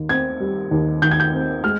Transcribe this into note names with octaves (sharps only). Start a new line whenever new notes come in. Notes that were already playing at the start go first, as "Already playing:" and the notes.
Already playing: D#2 D#3
C4 G#6
G3
D#2
D#3 G6
G#6
G6
C4
G#3 F6